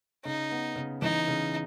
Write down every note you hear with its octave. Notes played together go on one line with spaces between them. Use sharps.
C#3 D#4
B3
C#3
E3 D#4
C#3